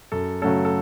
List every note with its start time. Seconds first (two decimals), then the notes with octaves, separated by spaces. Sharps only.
0.12 F#2 A4
0.42 C#3 F#3 A3 C#4 A4
0.65 A4